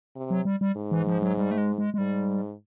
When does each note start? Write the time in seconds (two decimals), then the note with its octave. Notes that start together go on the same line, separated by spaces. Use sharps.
0.16 C3
0.31 F#3
0.45 G3
0.61 G3
0.76 G#2
0.91 E3
1.07 F3
1.22 F#3
1.37 G3
1.51 A3
1.58 G#3
1.78 G#3
1.94 G#3
1.98 G#2 G3